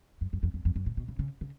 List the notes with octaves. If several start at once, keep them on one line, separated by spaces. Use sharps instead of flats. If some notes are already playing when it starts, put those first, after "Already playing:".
F#2
F#2
F2
F2
F2
F#2
A2
B2
C#3
C#3
C#3